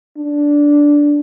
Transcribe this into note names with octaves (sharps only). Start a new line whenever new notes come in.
D4